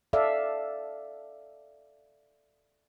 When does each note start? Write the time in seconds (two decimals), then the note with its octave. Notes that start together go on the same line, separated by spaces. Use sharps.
0.13 A4 D5 E5 F5